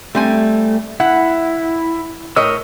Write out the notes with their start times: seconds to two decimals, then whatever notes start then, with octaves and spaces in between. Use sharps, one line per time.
0.15 G3 A3 C4 G#5
1.00 E4 F#5
2.36 A2 A#4 C#5 D#5 E6